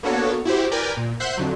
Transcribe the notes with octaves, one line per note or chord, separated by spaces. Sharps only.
A#3 B3 D4 F#4 A4 C#5
E4 F#4 G4 C5
A#4 B4 D5 G5 G#5
A#2
C5 E5 F#5 C6 F#6 G6
F2 D3 F#3